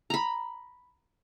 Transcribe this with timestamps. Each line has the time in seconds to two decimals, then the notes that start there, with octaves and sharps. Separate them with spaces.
0.10 A#5 B5